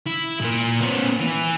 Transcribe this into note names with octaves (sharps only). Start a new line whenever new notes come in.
E4
A#2 A#3
B3 C#4
E3